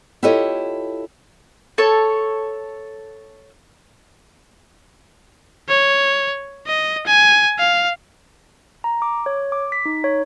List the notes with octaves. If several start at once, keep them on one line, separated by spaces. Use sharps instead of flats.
E4 F4 G4 A4 C#5 D#5
A4 C#5
C#5
D#5
G#5
F5
A#5
D6
C#5
D6
B6
D#4
C#5